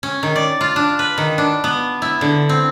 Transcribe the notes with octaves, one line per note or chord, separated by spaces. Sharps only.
C#4
D#3
D5
F4
D4
B4
D#3
D4
B3
E4
D3
C4